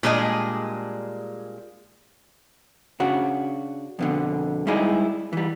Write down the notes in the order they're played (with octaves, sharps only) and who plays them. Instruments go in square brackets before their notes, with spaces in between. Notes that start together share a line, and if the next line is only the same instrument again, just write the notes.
[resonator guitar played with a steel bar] A#2 G3 G#3 D4 G#4 D#5
[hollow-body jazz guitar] C#3 D4 F#4
F2 B2 D3
G3 G#3 D#4 E4 G#4
E3 G3